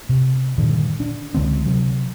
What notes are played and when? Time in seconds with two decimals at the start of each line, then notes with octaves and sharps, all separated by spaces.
0.09 C3
0.58 G2 A#2 D3 D#3
1.00 D4
1.34 C#2 D3 G#3 C4
1.66 C3 F#3